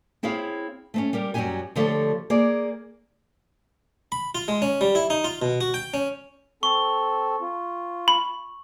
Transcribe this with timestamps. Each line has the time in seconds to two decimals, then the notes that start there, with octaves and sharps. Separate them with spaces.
0.23 C4 E4 G#4 C#5 F5
0.94 A3 C4 C#4
1.13 G3 G4 A#4
1.34 F#2 F#3 G3 D#4 G4 G#5
1.76 D3 F3 A3 G4 A4 C#5
2.30 A#3 G#4 D5
4.12 B5
4.35 F4
4.48 G#3
4.62 C#4
4.81 G3
4.95 E4
5.10 D#4
5.24 F4
5.42 B2
5.61 F#4
5.74 G5
5.94 C#4
6.63 C4 A4 C#6
7.42 F4
8.08 B5